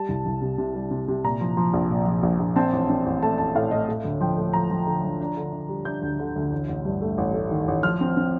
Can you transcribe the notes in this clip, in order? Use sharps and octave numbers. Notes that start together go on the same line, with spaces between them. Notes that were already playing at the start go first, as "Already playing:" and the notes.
Already playing: G3 A5
C2
C2
C3
C3
G3
C3
C3
A#2 A#5
F3
F3
A#1
A#2
F3
A#1
A#1
C4 A5
A1
C4
A1
A3 A5
A1 A5
A2 F5
A2 D#5
A3
D2
F3 G5
A3
F3 A#5
F3
D3
F3
D4
D3
D3
G3
D4 G6
D2
D3
D2
A1
A1
G2
A3
A1
A3
D#3
A1
F3 F6
C4
C4